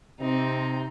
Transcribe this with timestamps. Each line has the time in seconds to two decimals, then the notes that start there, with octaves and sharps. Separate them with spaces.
0.20 C3 C4 D#4